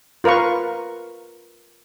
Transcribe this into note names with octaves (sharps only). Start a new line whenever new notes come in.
F4 A#4 B4 F5 C#6